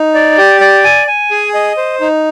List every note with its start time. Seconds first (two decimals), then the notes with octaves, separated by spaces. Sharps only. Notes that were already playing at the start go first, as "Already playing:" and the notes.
Already playing: D#4
0.14 D5
0.38 G4
0.61 D5
0.84 G#5
1.07 G#5
1.31 G#4
1.54 D#5
1.77 C5
2.01 D#4